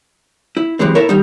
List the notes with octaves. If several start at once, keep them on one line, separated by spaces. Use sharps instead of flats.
E4
C3 E3 F#3 G#3 C4
E4 A4 A#4 C#5
D#3 G3 D#4